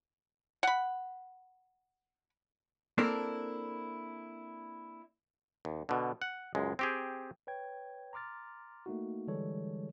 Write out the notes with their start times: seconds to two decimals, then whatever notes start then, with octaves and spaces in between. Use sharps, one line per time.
0.63 F#5 B5
2.98 A#3 C4 D4 E4 A4 A#4
5.65 D#2
5.89 B2 D3
6.22 F#5
6.55 C#2 F#2 G#3
6.79 C4 G4 G#4
7.47 B4 C#5 G5 G#6
8.13 A#5 C6 D6 F6 A6
8.86 A3 A#3 D#4 F#4
9.27 D3 E3 G3 G#3 A4 C#5